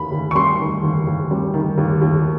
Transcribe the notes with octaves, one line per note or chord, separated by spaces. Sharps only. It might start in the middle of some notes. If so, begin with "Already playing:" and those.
Already playing: D#2 D#3 B5
D#2
C#6
G3 C6
D#3
D#2
D#2
G3
D#3
D#2
D#2